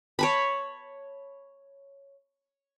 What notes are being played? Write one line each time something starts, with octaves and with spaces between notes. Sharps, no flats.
C#5 A5 B5